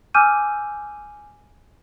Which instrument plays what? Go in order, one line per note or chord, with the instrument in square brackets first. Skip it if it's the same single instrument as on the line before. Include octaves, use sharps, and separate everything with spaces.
[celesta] G#5 D6 E6 F6 G6 D#7